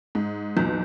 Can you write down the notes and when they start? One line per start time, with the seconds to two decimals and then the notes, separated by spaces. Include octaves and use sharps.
0.15 G#2
0.57 B1 E2 A#2